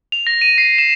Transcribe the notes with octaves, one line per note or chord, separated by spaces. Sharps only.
F7
A#6
D#7
C7
E7